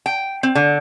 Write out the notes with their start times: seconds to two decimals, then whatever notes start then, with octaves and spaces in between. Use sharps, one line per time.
0.06 G5
0.43 C4
0.55 D3